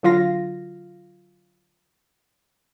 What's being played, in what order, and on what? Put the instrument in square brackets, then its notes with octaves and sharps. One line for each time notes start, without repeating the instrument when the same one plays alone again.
[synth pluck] D3 F#3 F4 F5 A#6